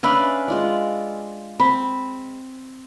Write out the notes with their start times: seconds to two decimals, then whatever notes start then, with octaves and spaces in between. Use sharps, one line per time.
0.03 C#4 D4 B4 D5 E5 F5
0.48 G#3 F4 D5
1.60 C4 B5